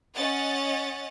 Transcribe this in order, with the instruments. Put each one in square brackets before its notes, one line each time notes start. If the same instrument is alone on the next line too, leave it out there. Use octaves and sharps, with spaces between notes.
[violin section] C#4 D#5 F#5 A6